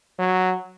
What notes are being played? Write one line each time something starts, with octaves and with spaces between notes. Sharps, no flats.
F#3